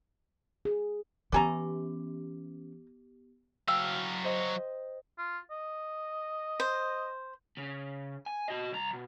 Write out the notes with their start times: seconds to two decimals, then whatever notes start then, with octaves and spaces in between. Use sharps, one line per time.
0.65 G#4
1.32 E3 B3 C#4 G4 B4 G#5 A#5 D6
3.68 F#3 F5 G5 E6
4.24 C5 D#5
5.18 F4
5.51 D#5
6.60 C5
7.57 C#3
8.26 G#5
8.48 F#4 D#5
8.72 C2 A#5
8.93 B2